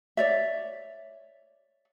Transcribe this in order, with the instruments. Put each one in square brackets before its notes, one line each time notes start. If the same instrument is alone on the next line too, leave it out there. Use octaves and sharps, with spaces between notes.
[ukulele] C#5 D5 E5